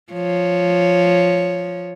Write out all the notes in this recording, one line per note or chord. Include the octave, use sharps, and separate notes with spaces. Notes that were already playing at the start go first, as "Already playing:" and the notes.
F3 C#5